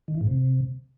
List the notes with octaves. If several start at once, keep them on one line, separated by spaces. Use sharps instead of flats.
D#3
E3
G#2
C3